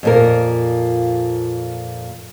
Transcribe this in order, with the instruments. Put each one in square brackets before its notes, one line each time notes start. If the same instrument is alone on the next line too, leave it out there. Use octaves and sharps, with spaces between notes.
[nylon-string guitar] F2 A#2 A#4